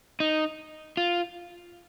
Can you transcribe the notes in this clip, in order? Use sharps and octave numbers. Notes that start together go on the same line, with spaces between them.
D#4
F4